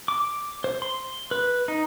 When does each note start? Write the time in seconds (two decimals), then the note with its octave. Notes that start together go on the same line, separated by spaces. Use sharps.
0.08 D6
0.64 C5
0.82 C6
1.31 B4
1.68 D#4